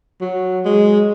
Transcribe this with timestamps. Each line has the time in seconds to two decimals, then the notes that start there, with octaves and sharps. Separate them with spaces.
0.21 F#3
0.65 G#3